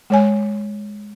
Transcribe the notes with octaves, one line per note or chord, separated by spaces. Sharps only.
G#3 C#5 G#5